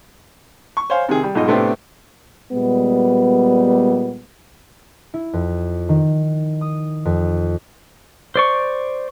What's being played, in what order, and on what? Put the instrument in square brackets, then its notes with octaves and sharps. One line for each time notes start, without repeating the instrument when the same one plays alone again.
[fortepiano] C#6
C5 C#5 F5 G#5
C3 D#3 G#4
G3
B1 G#2 F4 D#5
A2 C3 A3 B3 C4 D4
[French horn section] A#2 G3 G#3 B3
[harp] E4
F2
D#3
D#6
F2
[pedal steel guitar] C5 D5 C#6